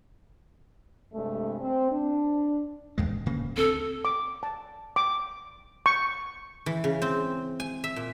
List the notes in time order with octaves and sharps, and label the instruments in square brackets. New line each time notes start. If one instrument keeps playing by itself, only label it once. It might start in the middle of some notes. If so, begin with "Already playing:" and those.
[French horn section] G2 C3 G#3 A3
C4
D4
[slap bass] D#1 E2 G#3
D1 C#3 A#3
[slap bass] D2 C4 [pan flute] A4
[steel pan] D6
A5
D6
C#6
[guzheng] E3
C#3
C4
G#5
E5
A#2